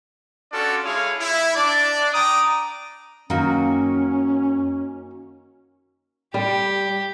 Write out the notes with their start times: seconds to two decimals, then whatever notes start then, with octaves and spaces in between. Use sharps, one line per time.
0.52 C#4 D4 F4 F#4 A4 D5
0.84 G#3 E4 G#4 C#5 F5 G#5
1.19 E4
1.55 D4 D5
2.12 G5 A#5 D6 D#6
3.30 F#2 D#3 A#3 C#4 F#4
6.34 G3 G4